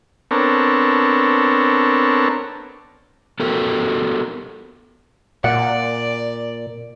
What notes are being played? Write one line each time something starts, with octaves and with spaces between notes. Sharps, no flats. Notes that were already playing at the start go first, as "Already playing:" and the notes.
B3 C4 D4 A4 A#4 C#5
B3 F#4 G4 A4 A#4
A#2 D5 F#5